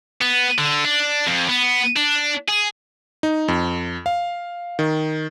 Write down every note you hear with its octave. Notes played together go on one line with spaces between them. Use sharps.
B3
D3
D4
F2
B3
D4
G#4
D#4
F2
F5
D#3